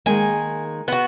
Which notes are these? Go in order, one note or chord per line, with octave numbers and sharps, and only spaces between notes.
D#3 G#3 A#3 G#5
B3 F#4